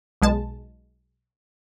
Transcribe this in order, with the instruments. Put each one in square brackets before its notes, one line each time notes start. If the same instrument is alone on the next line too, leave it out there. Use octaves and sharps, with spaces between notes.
[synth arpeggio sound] B1 G#3 A5